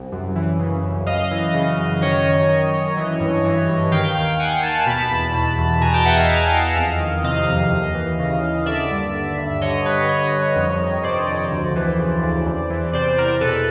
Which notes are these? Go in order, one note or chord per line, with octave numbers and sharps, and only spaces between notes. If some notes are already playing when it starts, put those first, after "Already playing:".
Already playing: C2
F#2
E3
C#3
F#2
F#2 D#5 F5
E3
C#3
F#2
D#3 C#5 D#5
F#2
D#3
F#2
E3
G2
E3
G2
D#3 F5 G5
D#2 F5 G5
D#3 F#5 G#5
D#2 G5 A5
B2 A5 B5
E2
B2
E2
B2 G#5 A#5
G5 A5
E2 E5 F#5
D#5 F5
B2 D#5 F5
E2
F2
D#3
C3 D#5 F5
F2
D#2
E3
C#3
D#2
D3 D5 E5
G2
D3
G2
D3 C#5 D#5
G2 B4 C#5
D3 C#5 D#5
G2
F2
D#3
C3 C5 D5
F2
D2
E3
C#3
D2
E2
E3
C3 C5 D5
E2 A#4 C5
B2 A4 B4